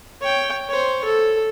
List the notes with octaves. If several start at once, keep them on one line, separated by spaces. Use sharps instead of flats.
C#5 G5
C5 C#5
A4